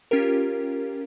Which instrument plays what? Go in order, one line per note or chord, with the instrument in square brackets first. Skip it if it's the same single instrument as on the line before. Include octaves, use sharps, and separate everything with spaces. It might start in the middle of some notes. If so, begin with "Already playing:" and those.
[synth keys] C#4 F4 G4 A#4